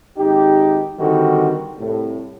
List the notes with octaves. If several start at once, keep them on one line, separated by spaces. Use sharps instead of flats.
G#1 D#4 G4
D3 D#3 G3 C4 F#4
C2 A2